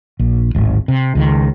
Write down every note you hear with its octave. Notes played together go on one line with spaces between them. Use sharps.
A#1
D1 G#1
C3
C#2 D#3